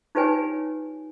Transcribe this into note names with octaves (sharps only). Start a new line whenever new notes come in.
D#4 F4 G4 B4 C#5 G#5